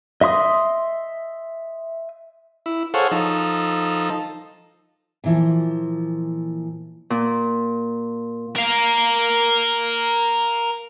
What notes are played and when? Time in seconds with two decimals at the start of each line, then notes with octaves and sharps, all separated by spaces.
0.21 D#5 E5 C6 D#6
2.66 E4
2.94 G#4 A4 C5 C#5 F5 F#5
3.11 F3 D#4 A4
5.24 A#2 E3 F3
7.10 A#2
8.56 A#4 F5